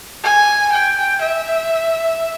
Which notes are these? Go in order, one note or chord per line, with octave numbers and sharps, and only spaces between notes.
G#5
G5
E5